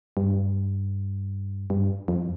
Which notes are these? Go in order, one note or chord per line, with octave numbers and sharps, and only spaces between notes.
G2
G2
F2